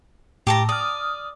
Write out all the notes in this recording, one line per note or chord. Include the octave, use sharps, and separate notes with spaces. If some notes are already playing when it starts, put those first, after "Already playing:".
A2 G4 A5 A#5
D5 D#6 F6